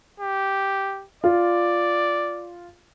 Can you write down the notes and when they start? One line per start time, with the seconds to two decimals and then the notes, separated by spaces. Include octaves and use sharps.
0.20 G4
1.24 F4 D5